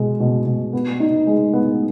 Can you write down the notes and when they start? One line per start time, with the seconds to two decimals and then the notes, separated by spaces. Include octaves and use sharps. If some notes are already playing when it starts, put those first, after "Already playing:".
Already playing: B2 G#3
0.20 B2
0.46 B2
0.73 B3
1.00 D#4
1.27 G#3
1.53 B3